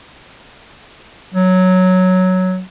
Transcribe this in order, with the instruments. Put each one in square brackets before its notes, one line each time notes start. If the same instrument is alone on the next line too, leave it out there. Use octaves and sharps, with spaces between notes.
[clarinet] F#3